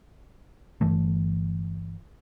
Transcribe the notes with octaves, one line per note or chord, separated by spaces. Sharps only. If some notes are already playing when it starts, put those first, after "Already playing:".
G1 G2 E3 A3